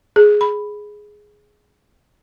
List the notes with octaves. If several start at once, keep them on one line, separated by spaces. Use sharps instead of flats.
G#4
B5